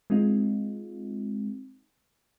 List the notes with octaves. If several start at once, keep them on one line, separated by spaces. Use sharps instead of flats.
G#3 C4 D#4 F4